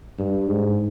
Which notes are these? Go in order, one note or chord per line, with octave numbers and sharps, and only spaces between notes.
G2
G#2